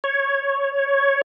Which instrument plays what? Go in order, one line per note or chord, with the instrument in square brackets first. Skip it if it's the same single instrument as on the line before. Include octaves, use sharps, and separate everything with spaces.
[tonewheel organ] C#5